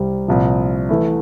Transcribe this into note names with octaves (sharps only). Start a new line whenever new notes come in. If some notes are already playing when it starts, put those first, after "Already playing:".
Already playing: C2 C3 G3
C2 A#2 F3
E3 A3 E4